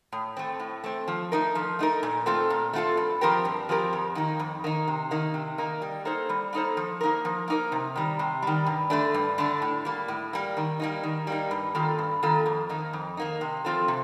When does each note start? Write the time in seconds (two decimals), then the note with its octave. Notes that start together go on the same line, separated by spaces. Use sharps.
0.12 A2
0.37 A3 C4
0.60 A2
0.84 A3 C4
1.08 F3
1.32 A3 D#4 A#4
1.55 F3
1.79 A3 D#4 A#4
2.03 A#2
2.26 A3 C4 F4 A4
2.50 A#2
2.73 A3 C4 F4 A4
2.97 G2
3.21 F3 C4 G4 A#4
3.45 G2
3.69 F3 C4 G4 A#4
3.93 F2
4.15 D#3 A#3 D#4
4.39 F2
4.64 D#3 A#3 D#4
4.88 C3
5.11 D#3 A#3 D#4
5.34 C3
5.58 D#3 A#3 D#4
5.82 G3
6.05 A#3 D#4 A4 C5
6.29 G3
6.53 A#3 D#4 A4 C5
6.77 F3
7.01 A#3 D#4 A#4
7.25 F3
7.48 A#3 D#4 A#4
7.72 C3
7.96 D#3 G3
8.19 C3
8.42 D#3 G3
8.66 G2
8.90 D3 A3 D4
9.14 G2
9.38 D3 A3 D4
9.62 A2
9.85 G3 A#3
10.08 A2
10.33 G3 A#3
10.57 D#3
10.80 G3 A#3 D#4
11.04 D#3
11.27 G3 A#3 D#4
11.51 G2
11.75 D#3 A#3 F4 A4
11.99 G2
12.23 D#3 A#3 F4 A4
12.46 F2
12.69 D#3 A#3 D#4
12.93 F2
13.17 D#3 A#3 D#4
13.41 C3
13.65 F3 C4 F4 A4
13.88 C3